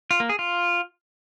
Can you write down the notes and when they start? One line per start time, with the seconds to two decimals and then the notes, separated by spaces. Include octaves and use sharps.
0.11 F4
0.20 A#3
0.29 G#4
0.39 F4